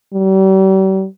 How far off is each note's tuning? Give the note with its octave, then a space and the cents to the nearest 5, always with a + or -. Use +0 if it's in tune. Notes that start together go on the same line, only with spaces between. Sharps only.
G3 -40